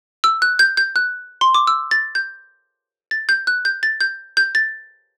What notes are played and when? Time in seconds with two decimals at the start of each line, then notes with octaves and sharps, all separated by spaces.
0.24 E6
0.42 F#6
0.59 G6
0.77 G6
0.96 F#6
1.41 C6
1.54 D6
1.67 E6
1.91 A6
2.15 G6
3.11 A6
3.29 G6
3.47 F#6
3.65 G6
3.83 A6
4.01 G6
4.37 G6
4.55 A6